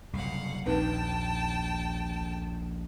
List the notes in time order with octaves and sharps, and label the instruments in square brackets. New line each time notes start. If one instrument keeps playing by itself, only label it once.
[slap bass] F#1 C2 [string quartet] F5 F#5
[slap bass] A#1 D#2 [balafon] C4 D#4 B4 [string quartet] G5 A5